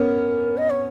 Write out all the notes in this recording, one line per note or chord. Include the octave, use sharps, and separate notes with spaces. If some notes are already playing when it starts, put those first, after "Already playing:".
Already playing: B3 C#4 A#4
D#5
C#5